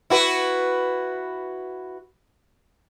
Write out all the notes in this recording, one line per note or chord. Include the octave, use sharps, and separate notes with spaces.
E4 F#4 B4